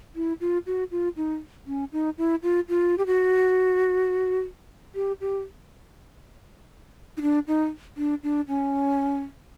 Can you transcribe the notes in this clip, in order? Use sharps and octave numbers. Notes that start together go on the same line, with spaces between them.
E4
F4
F#4
F4
D#4
C#4
D#4
E4
F4
F4
G4
F#4
G4
G4
D#4
D4
D#4
D4
D4
C#4